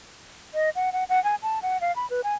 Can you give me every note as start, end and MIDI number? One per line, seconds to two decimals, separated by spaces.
0.54 0.70 75
0.75 0.93 78
0.93 1.04 78
1.09 1.22 78
1.24 1.35 80
1.43 1.59 81
1.62 1.80 78
1.81 1.94 77
1.96 2.09 83
2.10 2.21 71
2.24 2.35 80